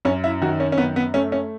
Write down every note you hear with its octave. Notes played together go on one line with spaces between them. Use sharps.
F#2 C#4
E4
D#3 F#4
C#4
C#4
F#2 B3
B3
A3 C#4
C#4